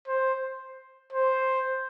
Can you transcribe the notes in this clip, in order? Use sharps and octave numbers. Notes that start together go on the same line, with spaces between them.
C5
C5